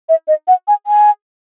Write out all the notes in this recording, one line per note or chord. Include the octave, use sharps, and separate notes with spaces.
E5
D#5
F#5
G#5
G#5